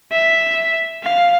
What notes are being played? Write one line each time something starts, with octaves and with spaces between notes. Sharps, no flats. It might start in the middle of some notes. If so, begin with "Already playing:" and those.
E5
F5